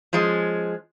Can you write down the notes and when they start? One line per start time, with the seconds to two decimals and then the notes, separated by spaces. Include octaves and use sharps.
0.13 F3 G#3 C#4